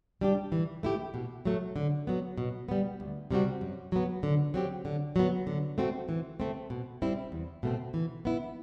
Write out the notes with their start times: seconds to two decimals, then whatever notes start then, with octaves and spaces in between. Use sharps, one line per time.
0.21 G3 D4 G4
0.52 E3
0.83 A3 E4 G4
1.14 B2
1.45 F#3 A3
1.76 D3
2.07 F#3 B3
2.38 B2
2.69 G3 B3
3.00 D2
3.31 C3 G3 C4 F#4
3.61 F#2
3.92 F#3 B3
4.23 D3
4.54 F#3 C4 G4
4.85 D3
5.16 F#3 B3
5.47 D3
5.78 A3 C4 F#4
6.09 E3
6.40 A3 C4
6.70 B2
7.02 G3 C4 E4
7.32 E2
7.63 B2 A3 C4
7.94 E3
8.25 B3 E4